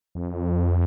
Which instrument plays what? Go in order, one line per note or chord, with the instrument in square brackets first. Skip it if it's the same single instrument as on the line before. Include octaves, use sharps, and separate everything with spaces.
[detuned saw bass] F2